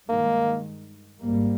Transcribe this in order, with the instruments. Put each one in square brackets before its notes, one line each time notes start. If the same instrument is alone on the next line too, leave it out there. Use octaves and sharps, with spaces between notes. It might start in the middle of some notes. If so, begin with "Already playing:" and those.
[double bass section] G2 D#3 G#3 [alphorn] A#3
[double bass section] G#1 G#2 G3 A#3